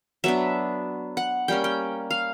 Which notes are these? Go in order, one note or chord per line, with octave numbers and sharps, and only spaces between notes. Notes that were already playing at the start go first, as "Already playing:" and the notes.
F#3 B3 D4 E5
F#5
G3 A#3 C#4 G5
G5
F5